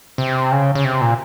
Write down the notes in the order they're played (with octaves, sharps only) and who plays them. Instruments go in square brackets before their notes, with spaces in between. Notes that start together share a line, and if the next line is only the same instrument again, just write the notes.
[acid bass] C3
C#3
C#3
C3
A#2